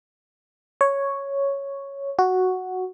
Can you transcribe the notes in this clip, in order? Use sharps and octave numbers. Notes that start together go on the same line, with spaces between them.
C#5
F#4